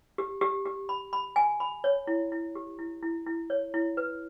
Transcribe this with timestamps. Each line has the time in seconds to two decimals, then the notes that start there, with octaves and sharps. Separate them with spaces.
0.18 G4
0.41 G4
0.66 G4
0.89 B5
1.13 B5
1.36 G#5
1.60 B5
1.84 C#5
2.07 E4
2.32 E4
2.55 G4
2.79 E4
3.02 E4
3.26 E4
3.50 C#5
3.74 E4
3.97 B4